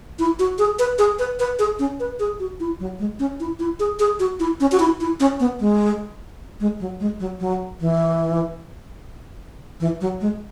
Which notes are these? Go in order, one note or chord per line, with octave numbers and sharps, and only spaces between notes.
E4
F#4
G#4
B4
G#4
B4
B4
G#4
C#4
B4
G#4
F#4
E4
F#3
G#3
C#4
E4
E4
G#4
G#4
F#4
E4
C#4
F#4
E4
E4
C#4
B3
G#3
G#3
F#3
G#3
F#3
F#3
E3
E3
F#3
G#3